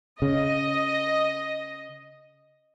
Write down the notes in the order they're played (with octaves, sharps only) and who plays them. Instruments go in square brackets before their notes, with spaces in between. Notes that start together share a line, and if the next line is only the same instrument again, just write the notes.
[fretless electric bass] C#3 [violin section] D#5